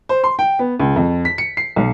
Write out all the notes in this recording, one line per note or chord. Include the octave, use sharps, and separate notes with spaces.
C5
C6
G5
B3
C#2
F2
B6
C#7
C7
B1